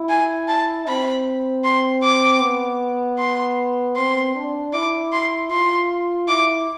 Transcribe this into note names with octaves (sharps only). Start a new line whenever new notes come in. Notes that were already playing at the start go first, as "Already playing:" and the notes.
Already playing: E4
G#5
A5
C4 B5
C6
D6
B3
C6
C4 C6
D4
E4 D6
C6
F4 C6
E4 D6